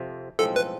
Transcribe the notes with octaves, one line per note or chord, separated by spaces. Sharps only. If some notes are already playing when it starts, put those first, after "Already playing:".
Already playing: F2 C3 F3
B1 A2 F3 G#3 C4 A4
B4